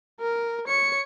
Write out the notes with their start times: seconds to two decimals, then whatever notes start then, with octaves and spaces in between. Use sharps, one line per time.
0.21 A#4
0.68 C#5 C#7